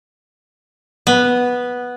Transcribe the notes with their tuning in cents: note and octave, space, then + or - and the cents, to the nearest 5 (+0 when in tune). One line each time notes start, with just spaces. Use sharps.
B3 -5